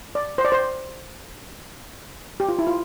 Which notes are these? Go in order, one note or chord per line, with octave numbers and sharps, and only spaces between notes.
D5
C5
D5
C5
G4
F4
E4
F4